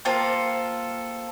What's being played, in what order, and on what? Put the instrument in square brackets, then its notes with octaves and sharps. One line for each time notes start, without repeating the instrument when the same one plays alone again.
[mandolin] A#3 F4 A4 [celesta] C5 G5